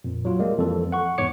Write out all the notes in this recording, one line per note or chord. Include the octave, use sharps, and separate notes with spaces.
F2 A#2
F#3 F4
G3 G#3 A#3
F2 E3 A4
F#5 C#6
E2 G#2 C#5 D6 C#7